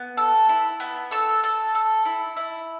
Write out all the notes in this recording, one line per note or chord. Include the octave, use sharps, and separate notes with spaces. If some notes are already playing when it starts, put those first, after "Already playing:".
Already playing: B3
A4
E4
B3
A4 E6
A4
A4
E4
E4